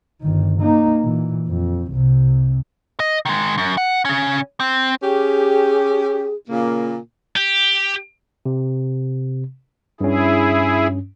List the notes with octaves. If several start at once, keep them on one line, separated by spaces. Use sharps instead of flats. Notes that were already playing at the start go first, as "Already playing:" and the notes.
G1 D#3
A#3 D#4
A#2 E3
F2
C2 C3
D#5
D#3 G#3
F#2
F#5
C#3 C#4
C4
C#4 G4 G#4
A#2 C#3 A#3
G4
C3
G2 C#4 E4 G#4